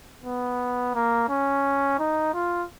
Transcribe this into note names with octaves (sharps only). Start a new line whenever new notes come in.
B3
A#3
C#4
D#4
F4